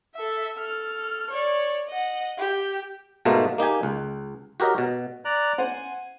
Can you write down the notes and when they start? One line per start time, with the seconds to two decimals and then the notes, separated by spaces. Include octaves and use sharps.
0.15 A4 E5
0.57 A4 F6
1.30 C#5 D5
1.88 D#5 F#5
2.38 G4
3.25 G#2 B2 A3 A#3 D#4 F4
3.58 A#3 D#4 G4 G#5
3.83 C#2
4.60 F#4 G4 A#4 C#5 D#5
4.78 B2
5.25 D5 A#5 F#6
5.58 C5 F#5 G#5